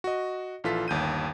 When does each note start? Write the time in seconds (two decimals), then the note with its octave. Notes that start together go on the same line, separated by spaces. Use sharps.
0.04 F#4 D#5
0.64 A#1 E3 F4 A4 B6
0.88 G1 D#2 G6 D#7